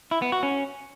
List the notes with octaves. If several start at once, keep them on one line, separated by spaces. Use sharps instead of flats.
E4
B3
F#4
C#4